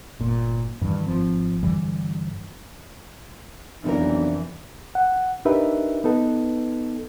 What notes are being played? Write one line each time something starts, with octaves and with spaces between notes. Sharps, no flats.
G1 A#2
G2 D#3 E3
G#1 F3 C4
G2 D3 E3 G3
B1 F2 C3 E3 D4 A#4
F#5
D4 D#4 G4 A#4 B4 E5
B3 D#4 A4 B4